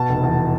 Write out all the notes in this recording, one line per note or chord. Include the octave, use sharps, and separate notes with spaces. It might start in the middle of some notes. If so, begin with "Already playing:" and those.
Already playing: B2 A5
F1
E2